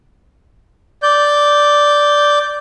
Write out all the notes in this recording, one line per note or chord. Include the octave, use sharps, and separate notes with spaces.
D5 G6